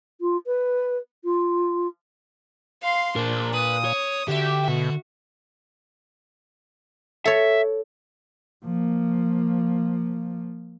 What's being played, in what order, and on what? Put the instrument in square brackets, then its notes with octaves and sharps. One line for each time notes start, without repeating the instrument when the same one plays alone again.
[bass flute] F4
B4
F4
[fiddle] F5 C6
[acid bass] A#2 [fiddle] D4 [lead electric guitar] A#4 C5
[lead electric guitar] B4 [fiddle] D#6
[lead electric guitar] C#5
[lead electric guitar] D3 [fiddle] F#4 E5 [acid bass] G4
[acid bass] B2 [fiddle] F#4
[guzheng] A4 C#5 [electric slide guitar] E5
[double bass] F3 A#3